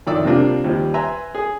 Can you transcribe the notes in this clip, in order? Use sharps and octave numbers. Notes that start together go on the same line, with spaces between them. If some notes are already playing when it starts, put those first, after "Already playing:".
F2 D#3 E4 D5 D6 E6
C3 F3 G3 A#3 D4 F4
D#2 F3 G3
B4 E5 G#5 A#5 C6
G#4